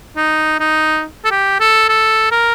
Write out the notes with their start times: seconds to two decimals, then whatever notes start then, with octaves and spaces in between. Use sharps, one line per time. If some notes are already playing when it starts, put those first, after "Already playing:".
0.16 D#4
0.59 D#4
1.24 A4
1.31 G4
1.60 A4
1.89 A4
2.31 A#4